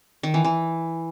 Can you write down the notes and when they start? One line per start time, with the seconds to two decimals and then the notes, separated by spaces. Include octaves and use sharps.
0.23 D#3
0.34 E3
0.44 E3